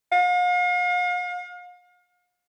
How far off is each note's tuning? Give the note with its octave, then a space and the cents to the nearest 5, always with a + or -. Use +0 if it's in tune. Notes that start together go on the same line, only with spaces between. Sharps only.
F5 +40